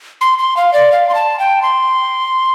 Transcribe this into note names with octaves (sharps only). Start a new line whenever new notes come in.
C6
C6
F5
D5
F5
C6
A5
G5
C6